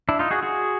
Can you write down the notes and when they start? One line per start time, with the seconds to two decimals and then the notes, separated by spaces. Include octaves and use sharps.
0.09 D4 E4
0.19 D#4 F4
0.31 F#4 G#4
0.43 F#4 G#4